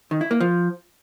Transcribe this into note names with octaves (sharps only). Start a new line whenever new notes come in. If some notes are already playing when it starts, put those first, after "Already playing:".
D#3
E4
A#3
F3